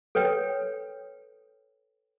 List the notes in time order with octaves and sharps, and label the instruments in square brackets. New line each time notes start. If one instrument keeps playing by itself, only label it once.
[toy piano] A4 B4 C#5 G5